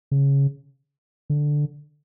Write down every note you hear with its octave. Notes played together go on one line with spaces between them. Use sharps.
C#3
D3